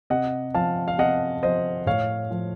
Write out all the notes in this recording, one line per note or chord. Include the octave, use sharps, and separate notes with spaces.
C3 D#5 F#5
F3 F5 A5
F5
C3 D#5 F#5
F3 C5 D#5
A2 C#5 F5
F3